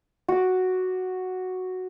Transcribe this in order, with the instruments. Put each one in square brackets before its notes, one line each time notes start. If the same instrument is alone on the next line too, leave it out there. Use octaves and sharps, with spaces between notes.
[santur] F#4 D6